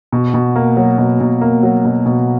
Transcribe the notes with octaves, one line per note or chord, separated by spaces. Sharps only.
B2
B2
A#3
F#3
B2
B2
A#3
F#3
B2
B2